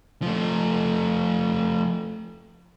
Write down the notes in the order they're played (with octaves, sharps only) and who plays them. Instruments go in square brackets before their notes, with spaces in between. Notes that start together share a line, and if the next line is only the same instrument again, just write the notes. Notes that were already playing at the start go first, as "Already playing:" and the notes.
[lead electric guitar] F3 A3